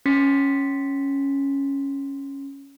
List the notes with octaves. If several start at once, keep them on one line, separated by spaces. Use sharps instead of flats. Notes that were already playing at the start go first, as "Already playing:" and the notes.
C#4 C6 A6 B6 C#7